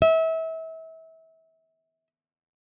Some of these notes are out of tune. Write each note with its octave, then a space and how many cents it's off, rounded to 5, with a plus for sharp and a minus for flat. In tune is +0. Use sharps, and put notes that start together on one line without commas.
E5 -30